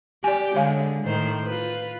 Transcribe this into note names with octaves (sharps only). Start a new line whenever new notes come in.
G4 D5 G#5
D3 G#3 C#5 F5 G#5
A2 D#3 C5
F4 B4